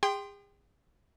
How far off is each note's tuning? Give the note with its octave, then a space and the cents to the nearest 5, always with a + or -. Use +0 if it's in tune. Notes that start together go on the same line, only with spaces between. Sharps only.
G#4 -40 G5 +0 C6 +0